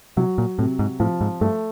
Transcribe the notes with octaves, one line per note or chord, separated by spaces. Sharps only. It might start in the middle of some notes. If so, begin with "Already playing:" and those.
C3 F#3
A#2
A2 C3
G#2
A2 F3
G#2
G2 A3